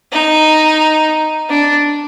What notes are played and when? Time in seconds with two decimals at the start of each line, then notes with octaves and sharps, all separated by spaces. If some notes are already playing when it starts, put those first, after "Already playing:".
0.13 D#4
1.50 D4